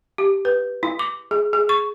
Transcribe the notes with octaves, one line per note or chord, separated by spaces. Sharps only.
G4
B4
E4
D6
G#4
G#4
C#6